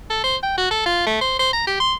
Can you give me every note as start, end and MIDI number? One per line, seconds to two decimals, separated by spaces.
0.10 0.23 69
0.24 0.36 72
0.43 0.56 79
0.58 0.68 66
0.71 0.82 69
0.85 1.05 65
1.06 1.16 57
1.21 1.34 72
1.39 1.53 72
1.53 1.64 82
1.67 1.75 67
1.80 1.94 84